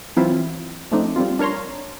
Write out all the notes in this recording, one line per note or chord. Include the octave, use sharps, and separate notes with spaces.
E3 F#3 C4 E4 F4
F3 A3 C4 D4 D#4
G3 C4 F4
D4 A#4 C#5 A#5 C6